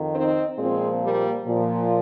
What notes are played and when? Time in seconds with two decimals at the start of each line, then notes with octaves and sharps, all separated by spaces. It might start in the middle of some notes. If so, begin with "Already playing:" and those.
Already playing: F2 D#3
0.14 C4 D#4
0.58 A#2 F3 G#3 C4
1.02 G3 A#3
1.45 A#2 F3